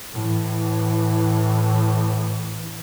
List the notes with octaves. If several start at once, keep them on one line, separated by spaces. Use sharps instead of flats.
A2 E3